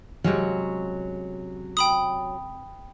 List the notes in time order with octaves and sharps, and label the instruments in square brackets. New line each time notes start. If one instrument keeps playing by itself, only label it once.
[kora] C3 G#3 C#4 [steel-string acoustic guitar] F#3
[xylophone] G5 B5 D#6